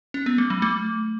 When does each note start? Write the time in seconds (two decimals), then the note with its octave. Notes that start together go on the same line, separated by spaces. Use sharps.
0.14 C#4
0.26 B3
0.38 A3
0.50 F#3
0.62 A3